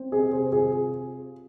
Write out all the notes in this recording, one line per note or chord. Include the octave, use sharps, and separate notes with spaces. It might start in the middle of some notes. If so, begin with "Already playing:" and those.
Already playing: C4
C3 G#4
C5
F4 G#4